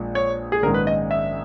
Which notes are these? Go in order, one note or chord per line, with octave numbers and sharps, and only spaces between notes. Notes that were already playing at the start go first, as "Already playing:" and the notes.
Already playing: A#1 A#2 G#3
C#5
G#4
A#1 G#2 D#3 G#3 C#4 A#4
B4
D#5
E5